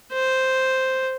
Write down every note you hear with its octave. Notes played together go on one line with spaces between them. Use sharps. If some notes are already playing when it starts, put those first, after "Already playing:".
C5